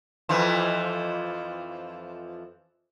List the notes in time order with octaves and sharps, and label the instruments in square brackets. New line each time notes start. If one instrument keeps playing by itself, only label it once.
[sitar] F2 E3 F3